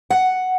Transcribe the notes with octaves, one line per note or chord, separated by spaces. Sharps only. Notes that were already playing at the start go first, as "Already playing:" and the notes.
F#5